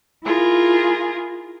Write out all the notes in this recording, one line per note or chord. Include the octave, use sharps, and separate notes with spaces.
E4 F4 G#4 A#4